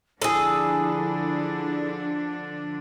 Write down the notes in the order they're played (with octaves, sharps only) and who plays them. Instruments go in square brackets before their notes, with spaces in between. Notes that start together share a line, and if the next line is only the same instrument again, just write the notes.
[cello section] D3 F3 D4 [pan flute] E4 [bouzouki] G#4 A4